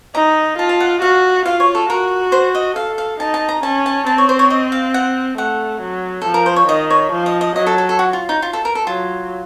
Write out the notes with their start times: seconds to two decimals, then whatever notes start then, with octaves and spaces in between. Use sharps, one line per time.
0.15 D#4 A#5
0.58 F4 A5
0.69 A5
0.80 F#5
1.02 F#4 F5
1.45 F4 F5
1.60 C#5
1.75 A4
1.89 F#4 A#4
2.32 C5
2.55 D#5
2.76 A4 F5
2.98 F5
3.20 D#4 A5
3.34 A5
3.49 A#5
3.63 C#4 A5
3.86 A5
4.07 C4 A5
4.18 C#5
4.29 C5
4.39 C#5
4.50 D#5
4.72 F5
4.94 F#5
5.38 A3 F#5
5.81 F#3
6.22 F3 A4
6.34 A#4
6.46 C5
6.56 C#5
6.68 D#3 D#5
6.90 C#5
7.12 F3
7.26 D#5
7.41 D#5
7.56 F#3 D#5
7.66 A4
7.78 A4
7.89 A4
7.99 F#4
8.13 F4
8.29 D#4
8.42 F4
8.53 A4
8.65 A#4
8.75 A4
8.86 F#3 F4